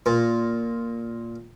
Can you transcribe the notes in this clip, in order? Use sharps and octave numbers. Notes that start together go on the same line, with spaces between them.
A#2